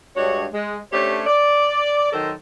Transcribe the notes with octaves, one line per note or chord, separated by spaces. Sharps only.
G2 G#3 D4 F#4 C#5
G#3
A3 C#4 D4 G4 C5 C#5
D5
D#3 F#3 A4 A#4 C5